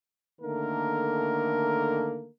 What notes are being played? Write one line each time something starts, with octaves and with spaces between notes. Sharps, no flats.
D3 D#3 A3 A#3 A#4